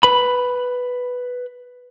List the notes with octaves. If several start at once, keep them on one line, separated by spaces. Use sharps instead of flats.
B4 B5